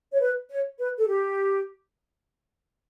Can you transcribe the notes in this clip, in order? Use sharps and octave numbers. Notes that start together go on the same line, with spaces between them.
C#5
B4
C#5
B4
A4
G4